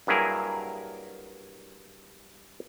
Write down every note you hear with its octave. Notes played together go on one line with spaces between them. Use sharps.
G2 F#3 A#3 E4 G#4 A#4